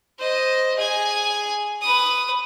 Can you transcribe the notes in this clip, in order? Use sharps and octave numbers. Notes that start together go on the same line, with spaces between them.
C5 D#5
G#4 G#5
B4 D#6